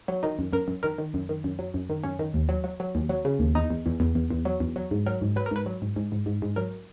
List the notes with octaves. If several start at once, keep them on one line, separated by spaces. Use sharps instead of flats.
F#3
D#3 D#4
F#2
F#2 A#4
F#2
D#3 A#4
D#3
F#2
D#3
F#2
F#3
F#2
D#3
F#2 C#4
D#3
D#2
F#3
F#3
F#3
D#2
F#3
C#3
D#2
E2 D#4
E2
E2
E2
E2
E2
F#3
E2
F#3
G#2
F#3 A#4
G#2
F#3 B4
A#4
G#2 B4
F#3
G#2
G#2
G#2
G#2
G#2
F#3 A#4